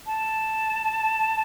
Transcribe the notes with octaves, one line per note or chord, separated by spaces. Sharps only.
A5